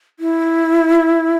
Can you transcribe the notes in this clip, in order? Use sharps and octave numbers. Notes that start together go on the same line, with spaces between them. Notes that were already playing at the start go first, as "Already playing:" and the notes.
E4